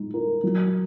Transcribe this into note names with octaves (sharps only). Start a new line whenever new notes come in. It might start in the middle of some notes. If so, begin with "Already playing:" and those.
Already playing: G#3 D#4
A#4
F#3